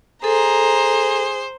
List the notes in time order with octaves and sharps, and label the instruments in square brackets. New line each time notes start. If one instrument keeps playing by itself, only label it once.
[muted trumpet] G#4 [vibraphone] A4 [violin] C5 [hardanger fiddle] A#5